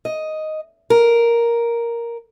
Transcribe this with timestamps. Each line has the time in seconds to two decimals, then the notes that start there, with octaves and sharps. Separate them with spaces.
0.05 D#5
0.90 A#4